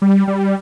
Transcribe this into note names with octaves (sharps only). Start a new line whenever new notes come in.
G3
G3